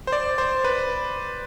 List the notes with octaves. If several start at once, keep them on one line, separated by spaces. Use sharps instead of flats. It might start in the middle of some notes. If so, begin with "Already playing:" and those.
C5
D5
C5
B4